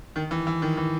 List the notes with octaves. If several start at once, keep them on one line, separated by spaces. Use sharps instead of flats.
D#3
E3
E3
D#3
E3